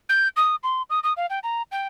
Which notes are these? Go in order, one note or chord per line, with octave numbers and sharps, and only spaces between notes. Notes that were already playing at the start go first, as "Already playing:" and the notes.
G6
D#6
C6
D#6
D#6
F5
G5
A#5
G5